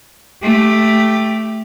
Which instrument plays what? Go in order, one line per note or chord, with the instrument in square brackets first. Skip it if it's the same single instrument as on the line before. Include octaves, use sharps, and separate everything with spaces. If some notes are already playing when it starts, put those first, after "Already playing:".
[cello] A3 G4